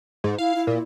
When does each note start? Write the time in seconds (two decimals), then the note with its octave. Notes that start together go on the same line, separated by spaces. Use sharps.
0.24 G#2
0.39 E4 F5
0.55 E4
0.67 A#2